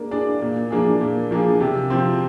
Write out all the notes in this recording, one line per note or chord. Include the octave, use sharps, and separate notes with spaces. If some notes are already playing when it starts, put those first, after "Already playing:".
Already playing: A#3 D4 G#4
D4 G#4 D5
A#2
F3 A#3 D4 G#4
A#2
F3 A#3 D4 G#4
C3
F3 C4